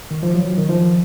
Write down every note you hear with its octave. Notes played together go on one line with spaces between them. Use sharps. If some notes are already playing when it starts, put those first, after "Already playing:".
D#3
F3
F#3
D#3
F3